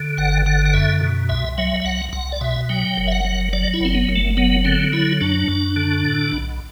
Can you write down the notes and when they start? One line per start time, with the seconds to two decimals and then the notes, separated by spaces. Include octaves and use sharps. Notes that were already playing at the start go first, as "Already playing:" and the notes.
Already playing: D3
0.17 G1 F#5
0.46 D3 F#5
0.66 F#5
0.74 F#2 E5
1.01 B2
1.29 C2 E5
1.58 F#3 E5
1.80 E5
1.85 C2 F#5
2.13 C2 F#5
2.32 D5
2.41 B2 E5
2.69 F#3 G5
2.97 F#1
3.07 E5
3.12 F#5
3.25 F#3
3.53 F#3 D5
3.74 E4
3.81 F#1 C4
3.95 B3
4.09 F#1
4.16 A3
4.37 F#3 B3
4.65 D3 C4
4.92 F#3 E4
5.21 F#2 D4
5.48 F#2
5.76 D3
6.05 A2
6.33 B1